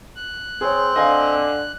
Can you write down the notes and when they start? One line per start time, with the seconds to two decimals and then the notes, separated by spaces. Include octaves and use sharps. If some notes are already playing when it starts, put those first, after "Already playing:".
0.16 F#6
0.61 C4 G#4 C#5
0.96 D3 D#5 F5 G#5